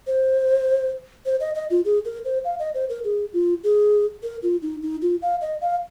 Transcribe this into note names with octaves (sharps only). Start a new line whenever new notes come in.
C5
C5
D#5
D#5
F4
G#4
A#4
C5
F5
D#5
C5
A#4
G#4
F4
G#4
A#4
F4
D#4
D#4
F4
F5
D#5
F5